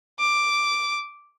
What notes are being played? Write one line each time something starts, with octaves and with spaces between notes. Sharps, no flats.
D6